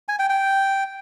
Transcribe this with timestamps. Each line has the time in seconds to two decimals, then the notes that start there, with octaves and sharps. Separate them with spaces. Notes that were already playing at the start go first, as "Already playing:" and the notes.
0.08 G#5
0.19 G5
0.30 G5